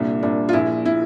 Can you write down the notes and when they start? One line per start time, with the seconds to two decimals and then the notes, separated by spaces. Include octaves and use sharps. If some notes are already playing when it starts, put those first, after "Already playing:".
Already playing: C2 A#2 D4
0.23 C2 A#2 D4
0.49 F4
0.53 A#1 A#2 E4
0.85 A#2 E4